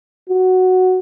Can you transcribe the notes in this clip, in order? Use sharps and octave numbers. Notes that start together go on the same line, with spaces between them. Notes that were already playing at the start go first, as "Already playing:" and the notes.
F#4